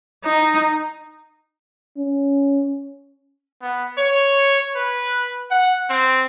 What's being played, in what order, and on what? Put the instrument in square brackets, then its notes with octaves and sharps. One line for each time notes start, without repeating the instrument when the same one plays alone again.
[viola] D#4
[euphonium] C#4
[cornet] B3
C#5
B4
F#5
C4